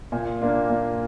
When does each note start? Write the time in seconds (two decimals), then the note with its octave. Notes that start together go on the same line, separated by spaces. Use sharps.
0.12 A#2
0.41 A#3 D4 F4
0.70 A#2